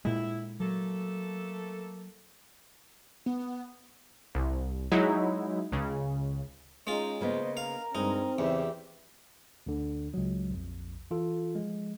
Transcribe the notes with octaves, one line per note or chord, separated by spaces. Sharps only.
A#2 G#3 E4
F#3 A3 A#3 A4
B3
C2
F#3 G#3 D#4 E4
C#2 C#3
G#3 C#4 D#4 F4
C#3 A#3 B3 C5 D#5
A#4 F5
G2 G#3 C4 D#4
E2 C#3 G4 E5
D2 D3
C#2 F#3
A#1 F2
E3 F4 A4
F3 G#3